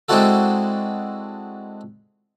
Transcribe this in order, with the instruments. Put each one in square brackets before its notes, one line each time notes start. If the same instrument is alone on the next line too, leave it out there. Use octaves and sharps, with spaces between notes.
[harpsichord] G#3 C4 D4 E4 F#4 A4